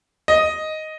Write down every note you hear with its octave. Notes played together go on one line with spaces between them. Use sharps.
D#5